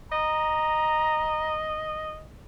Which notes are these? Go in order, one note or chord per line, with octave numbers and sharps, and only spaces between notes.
D#5 A#5